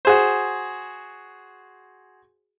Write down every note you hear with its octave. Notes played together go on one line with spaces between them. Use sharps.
F#4 G#4 C5